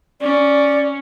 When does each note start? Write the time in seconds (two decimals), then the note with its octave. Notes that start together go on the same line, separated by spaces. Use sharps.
0.21 C#4 D5